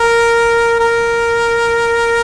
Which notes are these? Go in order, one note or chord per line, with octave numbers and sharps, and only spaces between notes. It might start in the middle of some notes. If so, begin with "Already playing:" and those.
Already playing: A#4
A#4